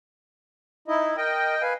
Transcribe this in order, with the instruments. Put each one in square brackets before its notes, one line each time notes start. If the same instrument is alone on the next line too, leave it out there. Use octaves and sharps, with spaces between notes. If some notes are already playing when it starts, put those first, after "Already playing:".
[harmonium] D#4 D#5 [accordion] E4
[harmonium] A#4 [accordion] D#5 G5
[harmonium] B4 F5 G#5